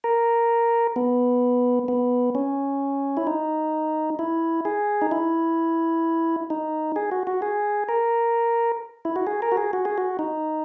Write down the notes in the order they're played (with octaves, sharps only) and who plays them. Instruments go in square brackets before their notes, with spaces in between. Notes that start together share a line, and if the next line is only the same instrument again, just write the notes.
[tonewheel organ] A#4
B3
B3
C#4
E4
D#4
E4
G#4
D#4
E4
D#4
G#4
F#4
F#4
G#4
A#4
E4
F#4
G#4
A#4
F#4
G#4
F#4
G#4
F#4
D#4